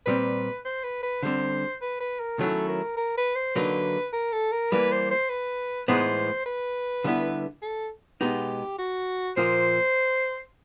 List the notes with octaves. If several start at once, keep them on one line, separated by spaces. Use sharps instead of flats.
A#2 G3 C4 B4
C5
B4
B4
D3 G3 C4 C5
B4
B4
A#4
D#3 F#3 A3 C#4 E4 A4
A#4
A#4
B4
C5
D3 F#3 A#3 D#4 B4
A#4
A4
A#4
E3 G3 A#3 B4
C5
C5
B4
A2 E3 G#3 B3 D#4 C5
B4
D3 G3 B3 E4
A4
B2 G#3 B3 D#4 G4
F#4
A#2 F3 A#3 C5